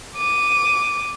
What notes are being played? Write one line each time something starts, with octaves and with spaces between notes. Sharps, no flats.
D6 D#7